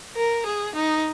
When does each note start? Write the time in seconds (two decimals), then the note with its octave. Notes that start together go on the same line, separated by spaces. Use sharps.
0.16 A#4
0.46 G#4
0.76 D#4